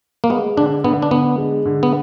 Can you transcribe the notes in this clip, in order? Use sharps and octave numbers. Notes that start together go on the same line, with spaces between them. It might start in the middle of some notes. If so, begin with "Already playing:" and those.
A#3
G#3 B3
D3 D4
D3 B3
D4
D3 B3
G#3
D3
B3